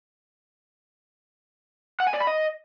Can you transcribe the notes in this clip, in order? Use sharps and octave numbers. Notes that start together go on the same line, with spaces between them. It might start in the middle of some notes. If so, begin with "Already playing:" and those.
F#5
G#5
D5
B5
D#5